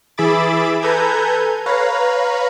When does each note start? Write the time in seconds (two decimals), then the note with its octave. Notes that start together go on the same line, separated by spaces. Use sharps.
0.18 E3 G#4 E5 B5 D6 A6
0.82 A4 B4 G#5 A#5 G6 G#6
1.66 B4 C#5 F5 A#5